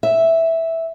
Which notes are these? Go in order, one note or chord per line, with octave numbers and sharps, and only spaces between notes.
E5